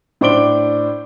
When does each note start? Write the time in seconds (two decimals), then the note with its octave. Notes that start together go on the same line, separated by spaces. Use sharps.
0.21 A2 D4 C5 D6 D7 G7